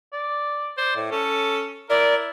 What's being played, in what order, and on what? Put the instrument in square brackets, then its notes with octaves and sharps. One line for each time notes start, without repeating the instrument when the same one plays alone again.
[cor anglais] D5
[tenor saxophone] C5 [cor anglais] D5
[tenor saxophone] A2
[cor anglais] C#4 [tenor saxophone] A4
[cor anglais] E4 [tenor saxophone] A#4 [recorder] D5